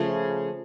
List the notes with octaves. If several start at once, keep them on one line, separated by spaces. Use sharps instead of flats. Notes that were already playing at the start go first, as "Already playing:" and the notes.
Already playing: C#3 F3 A3